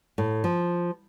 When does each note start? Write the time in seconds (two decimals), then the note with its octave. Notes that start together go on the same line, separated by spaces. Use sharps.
0.18 A2
0.44 F3